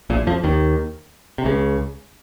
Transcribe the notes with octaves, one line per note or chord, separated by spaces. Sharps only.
A#1 A#2
F2 F3
D#2 D#3
C3
C#2 C#3